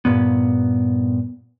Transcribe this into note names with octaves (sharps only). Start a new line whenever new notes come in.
G2 A#2 B3